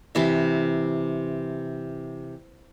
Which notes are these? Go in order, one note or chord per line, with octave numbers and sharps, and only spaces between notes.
C3 E3 E5